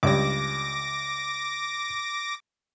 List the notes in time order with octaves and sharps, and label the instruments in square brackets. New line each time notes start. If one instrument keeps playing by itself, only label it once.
[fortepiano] C#2 G2 G3 [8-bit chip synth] D6 A#6